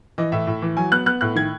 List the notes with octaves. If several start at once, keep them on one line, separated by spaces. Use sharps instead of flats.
E3 D#5
A2 E5
A2
E3
F#3 G#5
B3 F#6
B3 F#6
A2 F#6
D#3 G#6